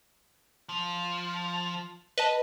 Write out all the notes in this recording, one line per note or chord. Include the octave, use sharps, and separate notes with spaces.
F3
B4 D#5 A5